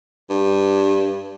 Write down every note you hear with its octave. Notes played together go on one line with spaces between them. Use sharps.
G2